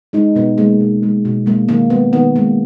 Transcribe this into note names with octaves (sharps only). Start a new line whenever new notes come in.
G#3 D#4
B2 B3
G#3 A#3
B2
G#3
B2
G#3 A#3
D#3 A#3
G#3 B3
D#3 B3
G#3 A#3